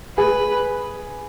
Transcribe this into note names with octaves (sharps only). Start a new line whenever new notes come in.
G#4 B4